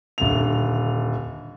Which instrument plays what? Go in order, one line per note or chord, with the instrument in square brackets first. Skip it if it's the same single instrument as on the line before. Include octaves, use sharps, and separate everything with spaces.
[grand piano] D#1 D3 F7